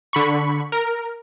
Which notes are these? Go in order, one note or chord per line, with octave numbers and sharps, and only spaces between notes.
D3 B5 C#6
A#4